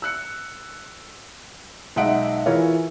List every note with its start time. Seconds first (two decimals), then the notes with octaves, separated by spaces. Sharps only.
0.02 E6 F#6 C#7
1.96 B1 G#3 D#4 E5 F#5 D7
2.46 E3 E4 F4 G#4 A#4 C#5